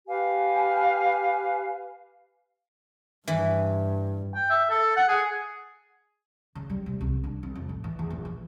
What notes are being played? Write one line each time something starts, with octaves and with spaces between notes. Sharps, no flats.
G4 B4 F5 G#5
G2 E3
G5
E5
A4
F#5
G#4
C#3
G3
C3
C2
D4
C2
F2
A2
E3
E2
A#1
E3